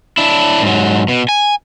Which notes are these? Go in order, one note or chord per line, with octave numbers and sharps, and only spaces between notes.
D4 E4
G#2 F#3
B2
G#5